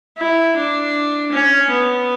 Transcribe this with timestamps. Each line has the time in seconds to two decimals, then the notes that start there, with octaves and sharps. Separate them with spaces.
0.17 E4
0.56 D4
1.32 C#4
1.70 B3